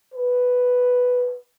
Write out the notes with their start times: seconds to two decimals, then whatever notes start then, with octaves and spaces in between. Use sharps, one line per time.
0.14 B4